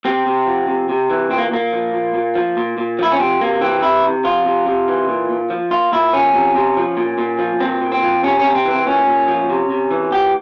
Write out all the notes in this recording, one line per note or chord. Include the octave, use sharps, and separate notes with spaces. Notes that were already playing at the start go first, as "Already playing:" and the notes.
C3 C4
C3
F3
C3
C3
E3
A#2 C4
A#3
A#2 A#3
F3
A#2
A#2
F3
A#2
A#2
F3 E4
C#4
C3 C4
C3 A#3
E3 C4
C3 E4
C3
F3 F4
C3
C3
E3
A#2
A#2
F3
A#2 F4
A#2 E4
F3 C#4
C3
C3
F3
A#2
A#2
F3
A#2 C4
A#2
C4
F3
C3 C#4
C3 C#4
C4
E3
C4
A#2 C#4
A#2
F3
C3
C3
E3
A#2 G4